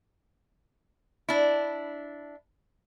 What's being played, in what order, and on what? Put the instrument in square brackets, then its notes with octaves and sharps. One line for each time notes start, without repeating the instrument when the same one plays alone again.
[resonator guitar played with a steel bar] D4 E4